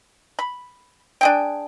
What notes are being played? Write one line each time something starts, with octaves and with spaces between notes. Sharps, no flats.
B5
D4 G#4 G5